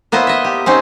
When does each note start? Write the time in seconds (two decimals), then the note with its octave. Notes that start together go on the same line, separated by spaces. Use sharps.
0.12 A#3 B3 E4 C5 D#5
0.27 D#5 E5
0.44 G4
0.66 C4 C#4 D#4 C5